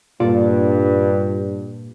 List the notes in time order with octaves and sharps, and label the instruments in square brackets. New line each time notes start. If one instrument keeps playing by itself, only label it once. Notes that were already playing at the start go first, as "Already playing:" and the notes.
[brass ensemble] G2 [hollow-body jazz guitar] A#2 A4 D5 [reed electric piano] F4